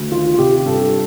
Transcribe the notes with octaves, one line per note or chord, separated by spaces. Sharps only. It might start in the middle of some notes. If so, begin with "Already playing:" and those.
Already playing: D2
D#3 F4
F4
C3 G4
G2 A4